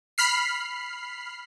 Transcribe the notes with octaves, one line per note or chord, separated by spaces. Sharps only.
B5 F6 C7